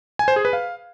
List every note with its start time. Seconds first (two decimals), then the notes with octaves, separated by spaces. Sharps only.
0.19 G#5
0.28 C5
0.36 G#4
0.45 B4
0.53 F5